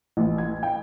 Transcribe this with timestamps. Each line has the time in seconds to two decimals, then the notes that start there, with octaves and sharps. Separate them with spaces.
0.17 A1
0.38 G#6
0.63 G5